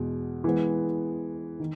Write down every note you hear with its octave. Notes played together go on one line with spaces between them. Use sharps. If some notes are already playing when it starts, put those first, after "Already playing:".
Already playing: E2 B2 G#3
E3 G#3 B3
D#3